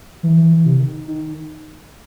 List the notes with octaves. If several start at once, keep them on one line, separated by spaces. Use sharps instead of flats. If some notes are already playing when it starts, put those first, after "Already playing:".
E3
E3
E3
C3
D#3
D#3